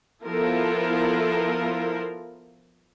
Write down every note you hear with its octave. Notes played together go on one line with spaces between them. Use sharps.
F3 B3 E4 F4 A4 A#4